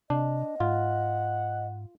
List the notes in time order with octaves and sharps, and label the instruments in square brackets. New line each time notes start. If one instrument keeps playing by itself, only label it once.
[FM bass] C3 [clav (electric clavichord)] D4 [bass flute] D#5
[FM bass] G#2 [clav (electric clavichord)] F4 [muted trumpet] F#5